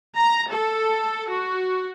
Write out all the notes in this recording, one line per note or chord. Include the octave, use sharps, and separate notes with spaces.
A#5
A4
F#4